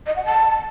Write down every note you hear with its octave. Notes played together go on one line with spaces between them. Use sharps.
D#5
F#5
A5